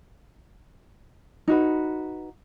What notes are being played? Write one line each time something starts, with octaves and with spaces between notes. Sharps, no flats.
D#4 F#4 B4